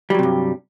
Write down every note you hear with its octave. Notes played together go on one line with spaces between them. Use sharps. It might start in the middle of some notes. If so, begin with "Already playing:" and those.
G2 C3 F#3 G3